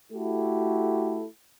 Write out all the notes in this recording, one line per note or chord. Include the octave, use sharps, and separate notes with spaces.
A3 E4 F#4 G4 A4